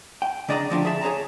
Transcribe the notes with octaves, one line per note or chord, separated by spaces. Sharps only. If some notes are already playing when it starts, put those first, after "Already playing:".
G5
C#3 D4 D5 D#5 F#5 A#5
D2 F3 D4 G4
G#4 E5 A5
G#4 C#5 F5 A5 A#5